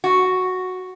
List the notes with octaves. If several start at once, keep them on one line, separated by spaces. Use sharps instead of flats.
F#4